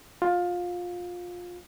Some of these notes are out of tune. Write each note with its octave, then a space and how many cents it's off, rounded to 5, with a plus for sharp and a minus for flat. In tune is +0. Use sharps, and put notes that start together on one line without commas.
F4 +20